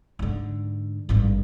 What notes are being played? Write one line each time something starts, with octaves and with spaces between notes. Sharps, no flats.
G#2 D3
G#1 G2